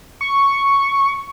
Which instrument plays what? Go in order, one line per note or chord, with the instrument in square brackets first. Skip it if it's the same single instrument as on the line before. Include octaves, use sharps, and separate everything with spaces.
[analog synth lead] C#6